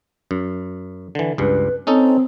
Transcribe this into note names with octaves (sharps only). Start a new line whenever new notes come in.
F#2
D3 E3
C#2 G2 B4
C4 C#4 D#4 A4